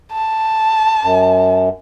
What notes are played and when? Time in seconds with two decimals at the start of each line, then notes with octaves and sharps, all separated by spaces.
0.13 A5
1.03 F#2